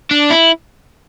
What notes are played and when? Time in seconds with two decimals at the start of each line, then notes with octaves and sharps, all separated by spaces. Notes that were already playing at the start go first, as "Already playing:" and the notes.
0.11 D4
0.31 E4